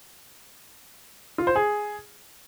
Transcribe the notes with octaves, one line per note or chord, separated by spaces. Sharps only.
F4
C5
G#4